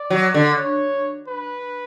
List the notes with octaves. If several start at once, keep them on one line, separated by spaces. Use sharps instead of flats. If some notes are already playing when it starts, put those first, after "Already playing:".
Already playing: D5
F#3
D3
C#5
B4